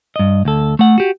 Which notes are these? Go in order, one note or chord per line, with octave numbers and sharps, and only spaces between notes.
G2 D#5
D2 A4
A3 F#5
F#4 G4